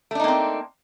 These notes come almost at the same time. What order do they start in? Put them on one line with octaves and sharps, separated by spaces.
A3 D4 D#4 A#3 C4